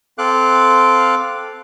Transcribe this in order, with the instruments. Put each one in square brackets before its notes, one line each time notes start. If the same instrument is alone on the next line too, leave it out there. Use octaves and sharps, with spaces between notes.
[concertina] C4 A4 F5 D6 F#6